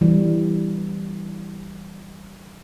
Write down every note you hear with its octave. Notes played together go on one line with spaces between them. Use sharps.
E3 G3